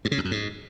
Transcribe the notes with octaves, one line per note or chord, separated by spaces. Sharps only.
G2
C#3
E2
F#2
G#2